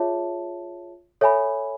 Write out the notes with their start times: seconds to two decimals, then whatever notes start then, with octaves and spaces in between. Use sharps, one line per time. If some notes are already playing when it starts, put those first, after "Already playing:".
Already playing: F4 G#4 C#5 E5 A5
1.21 A4 C#5 E5 G#5 B5